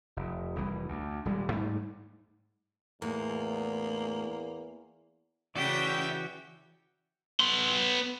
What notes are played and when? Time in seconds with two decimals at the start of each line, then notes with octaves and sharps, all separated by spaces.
0.16 F1
0.56 F1 C2 E3 G3
0.88 D2
1.25 D#1 G3 G#3
1.50 G#2 G3 A3
3.02 E2 A2 A#3
5.56 C#3 E3 F#4 G4 D5 E5 G5
7.40 B3 C6